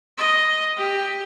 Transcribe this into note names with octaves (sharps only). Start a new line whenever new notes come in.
D#5
G4